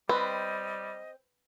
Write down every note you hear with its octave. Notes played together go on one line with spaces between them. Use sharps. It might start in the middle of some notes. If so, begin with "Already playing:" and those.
G3 C4 B4 D#5